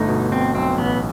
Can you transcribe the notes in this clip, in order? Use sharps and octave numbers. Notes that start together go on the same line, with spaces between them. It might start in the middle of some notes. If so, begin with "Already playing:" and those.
Already playing: G1 A3 D#4
B2
B2 C4
B1 C4
A1 B3